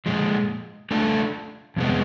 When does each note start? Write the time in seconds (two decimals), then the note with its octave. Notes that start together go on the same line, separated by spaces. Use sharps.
0.06 A#2 F3 G#3
0.91 A3 D4 F4 A4
1.77 F2 C3 G#3 B3